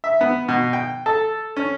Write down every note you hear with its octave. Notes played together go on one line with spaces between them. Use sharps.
E5
B3
B2
G5
A4
C#4